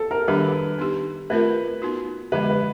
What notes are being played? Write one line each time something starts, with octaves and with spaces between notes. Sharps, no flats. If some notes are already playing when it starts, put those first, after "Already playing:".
Already playing: A4
A#4
D#3 G3 B3 D4 G4 B4
B3 D#4 G4
A3 C4 F4 A#4 B4
B3 D#4 F#4
D3 F3 G#3 B3 B4
B4